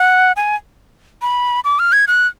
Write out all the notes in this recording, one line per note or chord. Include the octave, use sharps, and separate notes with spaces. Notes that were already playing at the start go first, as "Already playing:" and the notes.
Already playing: F#5
G#5
B5
D6
F6
G#6
F#6